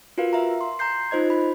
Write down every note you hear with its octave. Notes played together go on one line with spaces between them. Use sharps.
F4 F#4 A#4 B4 F5
E5 F5 A#5
C6
A#5 C6 G6 C7
D#4 F4 C5 D#5 G#6
B5